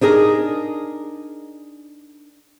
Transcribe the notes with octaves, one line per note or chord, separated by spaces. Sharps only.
D4 D#4 G#4 A#4